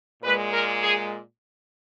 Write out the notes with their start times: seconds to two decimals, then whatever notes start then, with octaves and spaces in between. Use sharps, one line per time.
0.22 A#2 G#3 B4
0.52 A#4
0.82 G#4